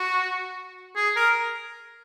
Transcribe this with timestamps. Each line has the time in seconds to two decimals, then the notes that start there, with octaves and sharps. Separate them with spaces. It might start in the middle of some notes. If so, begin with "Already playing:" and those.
Already playing: F#4
0.96 G#4
1.16 A#4